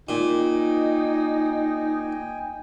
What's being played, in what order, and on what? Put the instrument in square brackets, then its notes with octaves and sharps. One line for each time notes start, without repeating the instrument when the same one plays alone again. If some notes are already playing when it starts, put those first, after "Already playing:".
[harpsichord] A#2 [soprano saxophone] D#4 [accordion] G5 G#5